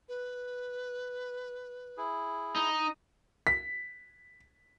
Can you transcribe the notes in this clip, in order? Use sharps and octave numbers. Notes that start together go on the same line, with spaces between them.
B4
E4 G#4
D#4
B6